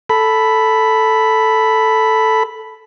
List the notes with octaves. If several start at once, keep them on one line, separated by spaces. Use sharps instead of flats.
A4 B5